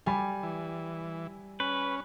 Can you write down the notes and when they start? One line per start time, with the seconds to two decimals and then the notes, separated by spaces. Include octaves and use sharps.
0.06 G3 D5 G#5 B5
0.43 E3
1.60 C#4 B4